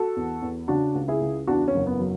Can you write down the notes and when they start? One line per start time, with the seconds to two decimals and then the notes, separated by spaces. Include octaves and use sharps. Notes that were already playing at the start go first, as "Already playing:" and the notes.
Already playing: F#4 A4
0.16 E2
0.42 E2
0.68 C#3 D4 F#4
0.95 C#2
1.08 E4 G#4
1.21 C#2
1.47 E2 D4 F#4
1.68 C#4
1.74 F#1
1.87 B3
1.99 F#3